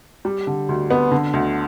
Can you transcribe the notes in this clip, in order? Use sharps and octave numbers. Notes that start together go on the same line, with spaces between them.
G3
D3
D2
B3
D3
D2